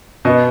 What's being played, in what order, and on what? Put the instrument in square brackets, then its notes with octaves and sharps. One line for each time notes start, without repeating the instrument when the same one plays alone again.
[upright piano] B2 B3 D#5